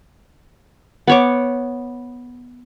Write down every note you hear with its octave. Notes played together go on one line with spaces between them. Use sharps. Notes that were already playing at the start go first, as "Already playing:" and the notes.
B3 C#5 D6